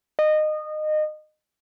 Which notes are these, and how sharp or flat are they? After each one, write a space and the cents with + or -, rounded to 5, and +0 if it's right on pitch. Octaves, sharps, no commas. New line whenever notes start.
D#5 -20